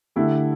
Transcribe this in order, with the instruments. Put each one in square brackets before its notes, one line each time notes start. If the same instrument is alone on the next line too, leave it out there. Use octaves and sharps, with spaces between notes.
[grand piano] D3 A3 E4 G4